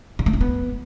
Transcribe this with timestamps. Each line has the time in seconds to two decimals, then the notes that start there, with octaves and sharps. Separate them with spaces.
0.19 C#3
0.26 A3
0.33 D4
0.41 B3